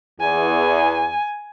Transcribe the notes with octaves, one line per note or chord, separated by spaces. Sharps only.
E2 G#5